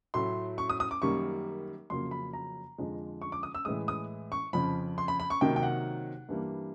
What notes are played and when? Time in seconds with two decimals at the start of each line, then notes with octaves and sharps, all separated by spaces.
0.14 A2 F#3 A3 C6
0.58 C#6
0.70 D#6
0.80 D#6
0.91 D6
1.02 F#2 D#3 G3 A#3 C#6
1.90 F2 C#3 F#3 A#3 C6
2.11 B5
2.33 A#5
2.78 F2 D3 F3 G#3
3.22 C#6
3.32 D6
3.43 D#6
3.55 E6
3.65 A2 E3 G#3 D#6
3.88 D#6
4.32 C#6
4.53 F2 C#3 F3 B5
4.98 C6
5.08 B5
5.20 B5
5.30 C#6
5.41 C3 D#3 F#3 A#3 G5
5.56 G5
5.63 F#5
6.29 G2 E3 G3 A#3